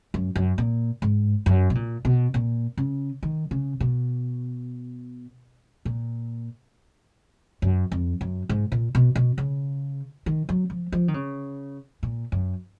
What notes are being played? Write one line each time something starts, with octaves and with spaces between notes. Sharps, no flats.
F#2
F#2
A#2
G#2
F#2
B2
A#2
B2
A#2
C#3
D#3
C#3
B2
A#2
F#2
F2
F#2
G#2
A#2
B2
B2
C#3
D#3
F#3
F3
F3
D#3
C#3
A#2
F#2